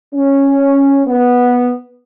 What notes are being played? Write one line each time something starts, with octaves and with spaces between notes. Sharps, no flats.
C#4
B3